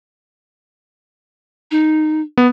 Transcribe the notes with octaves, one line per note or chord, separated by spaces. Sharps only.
D#4
B3